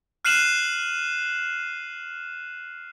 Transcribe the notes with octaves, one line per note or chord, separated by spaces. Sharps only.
F6 F#6 C7 D#7 E7 F#7